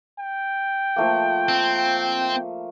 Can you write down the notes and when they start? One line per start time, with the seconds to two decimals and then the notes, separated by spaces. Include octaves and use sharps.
0.20 G5
0.96 F3 A3 A#3
1.49 C4